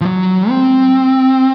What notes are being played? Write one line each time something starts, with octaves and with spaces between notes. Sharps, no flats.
F3
F#3
C4